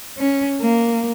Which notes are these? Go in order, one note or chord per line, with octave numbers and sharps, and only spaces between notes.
C#4
A#3